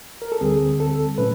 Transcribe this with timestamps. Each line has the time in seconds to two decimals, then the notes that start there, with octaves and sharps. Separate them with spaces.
0.22 A#4
0.32 A4
0.41 D2 D3 G3 C4 G#4
0.80 A4
1.18 A#2 F#3 A3 C#4 B4